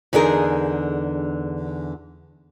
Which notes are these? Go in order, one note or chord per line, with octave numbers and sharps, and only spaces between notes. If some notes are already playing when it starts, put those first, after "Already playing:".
E2 D3 D4 D#4 G#4 A#4